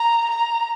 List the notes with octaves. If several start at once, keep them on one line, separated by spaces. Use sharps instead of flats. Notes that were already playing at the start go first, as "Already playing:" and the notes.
Already playing: A#5
A#5